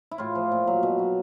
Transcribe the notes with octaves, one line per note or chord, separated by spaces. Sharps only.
E4
A2 F4
F3
A#2
F#3
B2
F#3